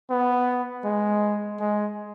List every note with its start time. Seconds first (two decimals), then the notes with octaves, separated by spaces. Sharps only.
0.10 B3
0.85 G#3
1.60 G#3